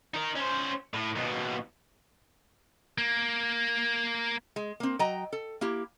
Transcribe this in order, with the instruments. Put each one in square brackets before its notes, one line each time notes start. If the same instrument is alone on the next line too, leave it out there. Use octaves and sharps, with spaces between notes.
[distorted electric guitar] D#4 A#4
C#4 C5
A2
D#2 B2
A#3
[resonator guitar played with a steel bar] G#3
A#3 C4
F#3 D#5 G5 A#5
A4
A#3 E4 G4